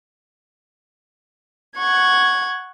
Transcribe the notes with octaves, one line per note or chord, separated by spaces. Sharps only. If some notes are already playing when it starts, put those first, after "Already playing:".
F#5 C#6 G#6